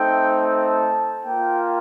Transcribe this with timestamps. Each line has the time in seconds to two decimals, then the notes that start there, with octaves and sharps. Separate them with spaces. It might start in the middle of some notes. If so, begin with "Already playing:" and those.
Already playing: A3 C4 D#4 G5
0.42 A5
1.24 A#3 F4 G5